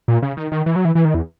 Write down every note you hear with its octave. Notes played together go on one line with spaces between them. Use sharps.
A#2
C#3
D#3
D#3
E3
F#3
E3
E3
D#3
E2